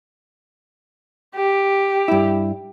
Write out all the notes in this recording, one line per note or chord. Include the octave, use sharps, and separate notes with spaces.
G4
G2 E4